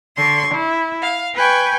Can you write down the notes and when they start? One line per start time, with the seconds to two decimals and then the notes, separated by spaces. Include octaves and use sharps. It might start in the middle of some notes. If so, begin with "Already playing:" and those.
0.16 D3 C6 C#6
0.53 E4
1.01 F5
1.35 B4 G5 G#5 C#6